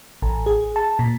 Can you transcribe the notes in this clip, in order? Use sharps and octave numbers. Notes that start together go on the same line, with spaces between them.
A1
G#4
A5
A#2